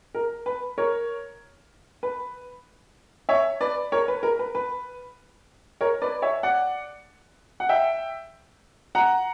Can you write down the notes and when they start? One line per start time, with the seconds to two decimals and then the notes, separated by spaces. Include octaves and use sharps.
0.15 A#4
0.46 B4
0.78 A#4 C#5
2.03 B4
3.29 C#5 E5
3.61 B4 D5
3.92 A#4 C#5
4.08 B4
4.23 A#4
4.39 B4
4.55 B4
5.81 A#4 C#5
6.02 B4 D5
6.22 C#5 E5
6.43 D5 F#5
7.60 F#5
7.69 E5 G5
8.95 F#5 A#5